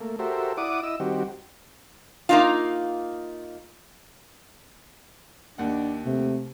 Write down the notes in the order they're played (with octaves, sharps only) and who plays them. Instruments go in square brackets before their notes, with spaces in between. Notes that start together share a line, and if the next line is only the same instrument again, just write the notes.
[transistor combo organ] A3 A#3
F#4 G4 A4 A#4 C5 E5
E4 D5 F#5 D6 D#6
E4 D#5 E6
D#3 G3 C4 F#4 G4
[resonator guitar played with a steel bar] A#3 D#4 F4
[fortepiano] D#2 F#5 [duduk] D4
[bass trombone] C3 [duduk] A3